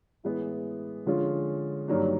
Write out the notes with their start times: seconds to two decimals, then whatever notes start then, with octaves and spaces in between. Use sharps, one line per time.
0.24 A2 E3 G#3 B3 E4
1.06 D3 F3 G#3 C#4 F4
1.88 G2 D#3 F#3 A#3 D4